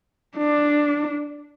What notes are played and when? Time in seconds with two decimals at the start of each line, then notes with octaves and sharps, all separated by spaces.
0.38 D4